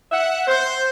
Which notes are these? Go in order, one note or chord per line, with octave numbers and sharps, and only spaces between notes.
E5 F#5
C5